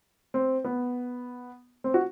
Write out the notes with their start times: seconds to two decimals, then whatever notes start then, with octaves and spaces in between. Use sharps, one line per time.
0.34 C4
0.64 B3
1.84 C4
1.94 F#4